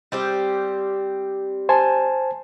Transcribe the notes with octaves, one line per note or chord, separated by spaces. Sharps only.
G3 C4 G4
C5 G#5 A5